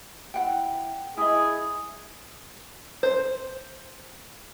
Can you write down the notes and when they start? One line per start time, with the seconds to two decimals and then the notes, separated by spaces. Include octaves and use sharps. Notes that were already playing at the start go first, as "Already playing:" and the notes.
0.34 E4 F#5 G5
1.17 E4 G#4 D#5
3.03 C5